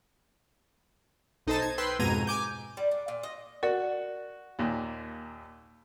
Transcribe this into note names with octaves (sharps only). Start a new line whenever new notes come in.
B1 D#4 A4 C5 D#5 A5
G#6
B4 G5 C6 E6
F2 G#2 B2 A#5 G#6 D#7
G#5 D6 G6
G3
D4
A#2
D#5
F#4 A#4 D5
D#2 A#2